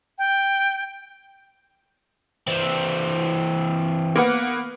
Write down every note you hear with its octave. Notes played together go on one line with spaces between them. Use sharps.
G5
E3 C4
A#3 B3 F#5